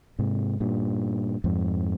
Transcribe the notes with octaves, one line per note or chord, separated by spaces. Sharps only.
G#2 C3
G2 A#2
F2 G#2